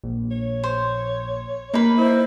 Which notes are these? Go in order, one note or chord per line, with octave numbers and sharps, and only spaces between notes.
A#1
C#5
C5
A#3 D#4 B4
E4 C5